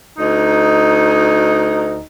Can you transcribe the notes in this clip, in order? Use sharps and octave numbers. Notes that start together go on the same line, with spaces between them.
D2 D#4